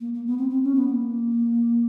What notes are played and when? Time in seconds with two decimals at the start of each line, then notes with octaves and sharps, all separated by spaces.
0.01 A#3
0.14 A#3
0.26 B3
0.38 C4
0.50 C4
0.63 C#4
0.75 B3
0.87 A#3